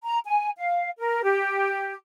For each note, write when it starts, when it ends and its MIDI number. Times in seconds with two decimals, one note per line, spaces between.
0.04 0.19 82
0.26 0.50 80
0.57 0.89 77
0.98 1.22 70
1.23 1.93 67